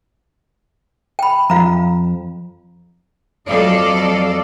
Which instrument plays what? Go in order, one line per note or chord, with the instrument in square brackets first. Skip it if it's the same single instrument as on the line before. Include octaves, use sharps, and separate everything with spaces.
[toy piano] G5 B5
[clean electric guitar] F2 [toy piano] F4 F5 A#5
[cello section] F2 F#3 A4 D5 D#5 F5